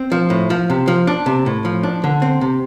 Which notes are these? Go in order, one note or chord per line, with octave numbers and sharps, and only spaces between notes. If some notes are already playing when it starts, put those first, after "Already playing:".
Already playing: C4
F3
A2
F3
C3
F3
D4
C3
A2
F3
D4
D3
C4
C3